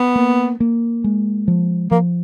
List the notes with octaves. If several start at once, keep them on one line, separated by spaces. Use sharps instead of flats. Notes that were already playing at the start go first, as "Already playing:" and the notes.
Already playing: B3
A#3
A#3
G#3
F3
F3 A#3